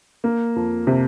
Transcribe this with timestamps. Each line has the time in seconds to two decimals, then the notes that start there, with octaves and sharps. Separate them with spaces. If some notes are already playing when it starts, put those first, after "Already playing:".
0.24 A#3
0.56 F2
0.87 C3